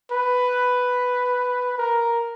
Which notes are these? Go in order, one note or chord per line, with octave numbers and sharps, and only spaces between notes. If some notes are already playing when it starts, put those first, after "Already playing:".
B4
A#4